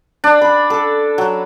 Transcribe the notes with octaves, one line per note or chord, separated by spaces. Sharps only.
D4
B5
A4
F#3